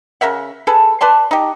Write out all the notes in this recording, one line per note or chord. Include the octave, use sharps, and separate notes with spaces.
C#3 A#4 E5 F#5
G#4 A4 B4
B4 D5 A5 C6
D#4 G4